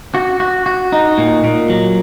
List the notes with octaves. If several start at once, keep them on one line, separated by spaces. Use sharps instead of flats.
F#4
F#4
F#4
D#4
A#2
A#2
F#3